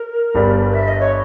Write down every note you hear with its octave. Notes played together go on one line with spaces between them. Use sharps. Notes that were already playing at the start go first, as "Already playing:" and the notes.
Already playing: A#4
G1 G2 G3 B3
E5
D#5
C#5